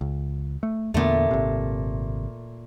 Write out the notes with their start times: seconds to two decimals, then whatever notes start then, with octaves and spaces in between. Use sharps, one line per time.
0.01 C#2
0.63 A3
0.94 E2 A#2 D3 A3 B3
1.31 G#1 C3